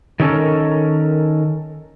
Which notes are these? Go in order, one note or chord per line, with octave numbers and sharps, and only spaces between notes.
D#3 F#3 C#4 A4 A#4